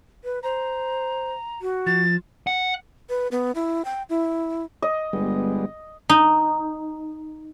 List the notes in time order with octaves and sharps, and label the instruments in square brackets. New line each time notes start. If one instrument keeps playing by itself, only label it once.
[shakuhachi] B4
[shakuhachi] C5 [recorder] A#5
[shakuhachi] F#4
[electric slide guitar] F3 [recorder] A6
[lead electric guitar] F#5
[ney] B4
B3
E4
G5
E4
[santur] D#5
[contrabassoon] G1 [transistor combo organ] G3 G#3 B3
[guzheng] D#4